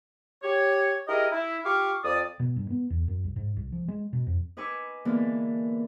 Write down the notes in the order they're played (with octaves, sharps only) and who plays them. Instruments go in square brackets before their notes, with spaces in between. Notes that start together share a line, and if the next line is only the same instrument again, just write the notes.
[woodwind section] G4 C#5
E4 G4 G#4 A#4 D#5
E4
F4 G4 F5 C#6 D6 F6
F2 D5 D#6
[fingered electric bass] B2
G2
B3
E2
F#2
C2
G#2
C2
F3
G#3
B2
F2
[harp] D#4 B4 G#5 C#6 D6 E6
D3 E3 G#3 A#3 B3 D4